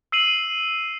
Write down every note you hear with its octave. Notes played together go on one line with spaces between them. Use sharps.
E6 C7 D#7 F#7